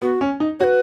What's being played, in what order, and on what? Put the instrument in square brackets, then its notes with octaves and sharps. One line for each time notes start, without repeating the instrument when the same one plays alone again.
[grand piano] B3 [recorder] F#4
[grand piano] C#4
D#4
[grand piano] F#4 [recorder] B4 C#5